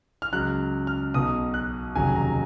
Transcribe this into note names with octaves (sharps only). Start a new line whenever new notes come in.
F6
C#2 C#3 F#3 F#6
F6
B1 B2 F#3 D#6
F#6
F1 D#2 C#3 F#3 G#5
A#5